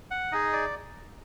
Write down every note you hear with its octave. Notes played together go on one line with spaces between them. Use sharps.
F#5
D#4 G#4 D#5
D5